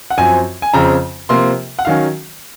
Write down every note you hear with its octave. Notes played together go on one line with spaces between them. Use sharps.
F#5
F#2 F3 C4 G#5
G#5
F2 C#3 F3 C4 A#5
C3 F3 A#3 C6
F#5
D#3 F#3 C#4 F5